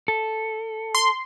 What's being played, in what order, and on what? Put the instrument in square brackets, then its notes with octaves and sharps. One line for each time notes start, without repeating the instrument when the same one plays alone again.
[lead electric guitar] A4
[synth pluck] C6